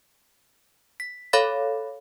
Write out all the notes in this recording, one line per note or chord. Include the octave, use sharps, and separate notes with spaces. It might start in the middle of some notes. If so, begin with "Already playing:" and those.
B6
A4 C#5 F5 B5 A6